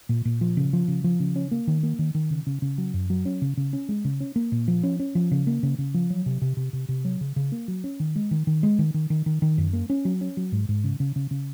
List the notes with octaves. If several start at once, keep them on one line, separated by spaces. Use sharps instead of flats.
A#2
A#2
F3
C#3
F3
C#3
F3
C#3
C#4
A#3
D#3
A#3
D#3
D#3
C#3
C#3
C#3
F#3
F#2
F#3
C#4
C#3
C#3
C#4
G#3
C#3
C#4
A#3
A#2
F3
C#4
C#4
F3
C#3
A#3
C#3
C#3
F3
F#3
C3
C3
C3
C3
C3
F#3
C#3
C#3
A#3
F#3
C#4
D#3
G#3
D#3
D#3
G#3
D#3
D#3
D#3
D#3
D#3
F#2
A#3
C#4
F#3
C#4
F#3
G#2
G#2
C#3
C#3
C#3
C#3